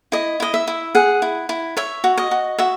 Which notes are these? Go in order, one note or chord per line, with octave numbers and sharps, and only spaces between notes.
E4 D#5
E4 D#5
E5
E4
G#4 F#5
E4
E4
C#5 E5
F#4
D#5
F#4
F#4 E5